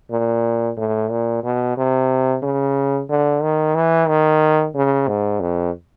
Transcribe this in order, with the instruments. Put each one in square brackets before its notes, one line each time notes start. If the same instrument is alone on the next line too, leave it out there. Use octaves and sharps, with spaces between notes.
[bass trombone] A#2
A2
A#2
B2
C3
C#3
D3
D#3
E3
D#3
C#3
G#2
F2